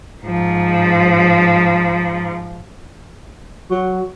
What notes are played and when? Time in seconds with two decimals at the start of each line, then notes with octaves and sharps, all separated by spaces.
0.23 G#2 F3
3.71 F#3